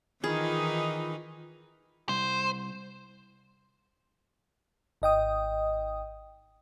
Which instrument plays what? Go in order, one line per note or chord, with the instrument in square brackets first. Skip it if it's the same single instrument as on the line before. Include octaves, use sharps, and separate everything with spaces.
[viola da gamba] D#3 E3 D#4 [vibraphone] F4 B5 [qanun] G#4
[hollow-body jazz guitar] C2 [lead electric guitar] C5
[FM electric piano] G#1 D#5 G5 D#6